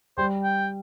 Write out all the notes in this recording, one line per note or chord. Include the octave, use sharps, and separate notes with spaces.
G3 C5
G5